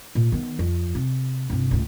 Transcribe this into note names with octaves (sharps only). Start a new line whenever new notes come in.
A#2
D#3 B3
F2
C3
G1 C3
C#2 A2